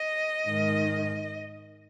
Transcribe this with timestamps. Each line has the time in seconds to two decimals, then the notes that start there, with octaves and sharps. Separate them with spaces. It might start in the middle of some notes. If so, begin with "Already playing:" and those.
Already playing: D#5
0.46 G#2 D#3